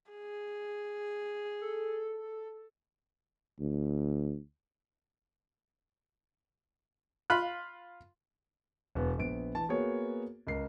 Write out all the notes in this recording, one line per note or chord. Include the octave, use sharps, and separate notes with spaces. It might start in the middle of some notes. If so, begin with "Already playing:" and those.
G#4
A4
D2
F4 B5 C6 F#6
E1 B3
A#1 B3 D7
E3 A5
A#3 B3 F#4 G#4 C#5
C#2 A#4 C7